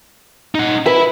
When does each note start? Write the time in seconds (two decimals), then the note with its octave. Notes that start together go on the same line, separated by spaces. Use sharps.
0.55 D#4 F#5
0.86 B4 E5 B5